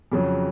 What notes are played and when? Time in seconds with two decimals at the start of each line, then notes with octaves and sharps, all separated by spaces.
0.12 F2 C#3 F#3